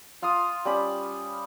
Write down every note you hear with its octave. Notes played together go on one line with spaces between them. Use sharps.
F4 F5 C6 D#6
G3 C#4 B5